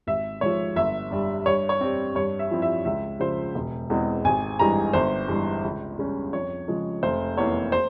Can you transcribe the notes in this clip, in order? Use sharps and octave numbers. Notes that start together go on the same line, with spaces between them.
G#1 E5
G#2 F3 C#5
G1 E5
G2 G3
G2 C#5
C#5
G3 C4
G2 C#5
E5
F3 C4 E4
E5
C#2 E5
C#3 F3 C5
E1
E2 E3 G#3 C4
G#1 G#5
G2 E3 G#3 A#5
G1 C5
G2 E3 G#3
C#2
C#3 G3 C#4
F2 C#5
C#3 F3 G#3
F1 C5
E2 E3 A#3 C#5
C5